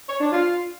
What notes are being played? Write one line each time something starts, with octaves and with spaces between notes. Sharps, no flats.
C#5
D4
F4